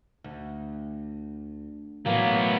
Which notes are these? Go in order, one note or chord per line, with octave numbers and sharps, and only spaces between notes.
D2
A2 E3 F#3 A#3 B3